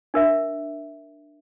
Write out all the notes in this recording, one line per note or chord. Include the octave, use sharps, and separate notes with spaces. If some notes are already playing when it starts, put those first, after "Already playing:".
D4 A#4 E5